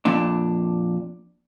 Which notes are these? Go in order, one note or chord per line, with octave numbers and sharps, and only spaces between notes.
F2 A#2 D4